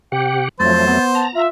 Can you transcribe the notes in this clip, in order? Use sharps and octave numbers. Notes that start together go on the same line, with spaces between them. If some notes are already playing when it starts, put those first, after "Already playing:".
C3 G4 F#5 G5
F2 F3 F#3 A3 C5 A6
B3
A5 A#5
F4 E5